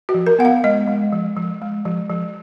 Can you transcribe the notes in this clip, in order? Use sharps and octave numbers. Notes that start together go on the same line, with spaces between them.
F#4
F3
A#4
B3 F#5
F5
G#3 D#5
G#3
F3
F3
G#3
F3
F3